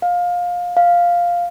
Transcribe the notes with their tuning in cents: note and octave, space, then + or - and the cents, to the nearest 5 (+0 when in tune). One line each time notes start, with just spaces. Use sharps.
F5 +20
F5 +0